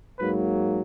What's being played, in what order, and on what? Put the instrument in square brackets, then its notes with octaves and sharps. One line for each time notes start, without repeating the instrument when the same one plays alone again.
[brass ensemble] G#2 F#3 A#3 B4